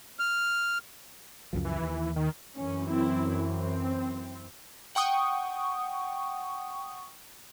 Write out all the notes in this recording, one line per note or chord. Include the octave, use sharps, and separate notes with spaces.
F6
C#2 F#2 F3
E3
D#2
D#3
F#2 E3 C#4
C4 E4
C4
F#5 G5 C#6 D#6